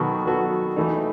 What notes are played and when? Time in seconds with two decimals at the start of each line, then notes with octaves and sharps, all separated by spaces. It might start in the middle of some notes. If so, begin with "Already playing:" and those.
Already playing: B2 D#3 F#3 B3 F#4 A4
0.26 F#3 B3 F#4 A4
0.76 E3 A3 D#4